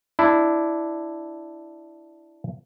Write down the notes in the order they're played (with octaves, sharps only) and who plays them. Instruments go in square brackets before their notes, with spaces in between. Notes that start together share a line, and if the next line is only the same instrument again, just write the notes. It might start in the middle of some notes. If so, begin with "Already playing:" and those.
[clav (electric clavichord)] D4 E4